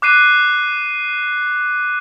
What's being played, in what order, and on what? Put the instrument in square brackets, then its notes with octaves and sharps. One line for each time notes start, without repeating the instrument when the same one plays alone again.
[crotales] D6 F#6 C7 D#7